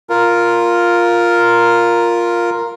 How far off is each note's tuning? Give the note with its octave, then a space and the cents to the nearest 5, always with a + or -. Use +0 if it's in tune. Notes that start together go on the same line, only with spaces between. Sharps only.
F4 +0 A#4 +0